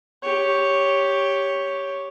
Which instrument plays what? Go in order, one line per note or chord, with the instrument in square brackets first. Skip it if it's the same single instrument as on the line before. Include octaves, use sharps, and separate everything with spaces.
[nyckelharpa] G4 C#5